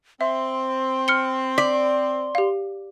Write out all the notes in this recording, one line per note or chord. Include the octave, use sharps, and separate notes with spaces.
C4 E5 C6
F6 C#7 G7
D5 B6
G4 F5